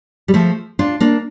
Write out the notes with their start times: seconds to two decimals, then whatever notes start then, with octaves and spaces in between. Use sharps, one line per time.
0.28 G3
0.34 F3 A3
0.79 D4 F4
1.00 A#3 D4